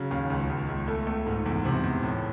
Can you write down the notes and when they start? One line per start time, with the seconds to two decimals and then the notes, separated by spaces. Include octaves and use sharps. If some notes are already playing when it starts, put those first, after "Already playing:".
Already playing: C#3 F#3
0.11 D#2
0.30 C#2
0.49 C#2
0.68 C#2
0.88 A3
1.07 A3
1.26 G#2
1.46 E2
1.65 C3
1.84 E2
2.03 A2